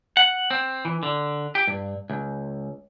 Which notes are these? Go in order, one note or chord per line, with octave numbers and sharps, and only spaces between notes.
F#5
C4
E3
D3
G4
G2
C#2